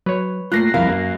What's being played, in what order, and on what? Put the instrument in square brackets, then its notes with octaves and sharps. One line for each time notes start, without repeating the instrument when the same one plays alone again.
[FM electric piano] F#3 [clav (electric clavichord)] B4 C#5
[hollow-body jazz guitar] A3 A#3 F4 [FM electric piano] F#6 A#6 C7
[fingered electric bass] C2 F2 C3 [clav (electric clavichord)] E4 A#4 [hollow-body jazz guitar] F5
[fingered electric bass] F#2 [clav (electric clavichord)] A#3